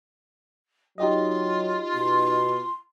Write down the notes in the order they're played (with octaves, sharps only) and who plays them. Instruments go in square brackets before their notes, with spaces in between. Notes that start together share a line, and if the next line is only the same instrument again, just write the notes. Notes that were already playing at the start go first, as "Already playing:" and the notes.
[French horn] F#3 [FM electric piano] D#4 G4 D#5 [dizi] F4
[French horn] B2 [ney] C6